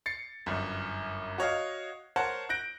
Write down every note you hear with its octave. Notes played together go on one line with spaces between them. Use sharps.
A6 C7 C#7
G1 F#2
F#4 C#5 D#5 F5
A#4 C5 C#5 F#5 A5
F#6 G6 A#6 D7